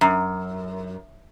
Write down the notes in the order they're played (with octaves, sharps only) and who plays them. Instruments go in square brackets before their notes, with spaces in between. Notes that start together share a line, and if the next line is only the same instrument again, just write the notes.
[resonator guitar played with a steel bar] F#2